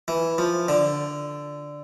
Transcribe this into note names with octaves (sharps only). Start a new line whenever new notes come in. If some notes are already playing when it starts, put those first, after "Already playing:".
E3
F3
D3